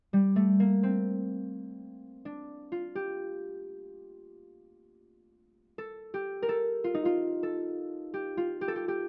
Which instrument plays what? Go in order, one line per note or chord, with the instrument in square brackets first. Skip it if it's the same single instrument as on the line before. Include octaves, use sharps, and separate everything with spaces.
[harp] G3
A3
A#3
C4
D4
F4
G4
A4
G4
A#4
A4
F4
D#4
F4
A4
G4
F4
G4
A4
G4
G4